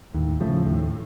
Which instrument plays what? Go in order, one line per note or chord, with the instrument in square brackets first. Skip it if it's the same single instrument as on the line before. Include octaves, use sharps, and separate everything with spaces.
[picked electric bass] D#2 [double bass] A2
[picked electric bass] C#3 F3 A3
D#2